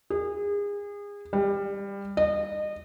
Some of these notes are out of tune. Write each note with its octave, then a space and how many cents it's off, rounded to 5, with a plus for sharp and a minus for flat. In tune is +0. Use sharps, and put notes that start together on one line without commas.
G#4 -30
G3 +20
D#5 -30